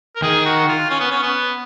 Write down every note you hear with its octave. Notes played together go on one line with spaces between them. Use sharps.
A#4
D#3 G#4
F#4
F4
C#4
B3
C#4
B3